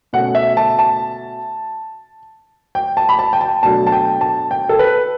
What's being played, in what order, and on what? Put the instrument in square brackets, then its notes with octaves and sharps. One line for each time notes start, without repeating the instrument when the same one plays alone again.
[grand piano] B2 A3 C#4 F#5
E5
A5
A5
G5
A5
B5
A5
G5
A5
B2 F#3 A3 D4 A5
A5
G5
A5
G5
A4
B4